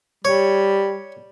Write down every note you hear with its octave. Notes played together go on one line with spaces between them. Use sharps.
G3 C#5